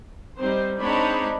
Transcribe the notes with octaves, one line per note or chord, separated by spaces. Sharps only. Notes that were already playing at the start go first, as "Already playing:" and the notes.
G3 C4 D#4 C5
G#3 C4 D4 D#4 C#5 B5